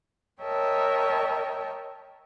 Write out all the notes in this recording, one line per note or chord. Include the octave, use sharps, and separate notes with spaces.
A#4 C#5 D#5 E5 G5 A5